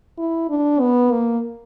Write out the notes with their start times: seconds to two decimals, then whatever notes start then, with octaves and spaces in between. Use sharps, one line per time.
0.18 E4
0.50 D4
0.81 B3
1.12 A#3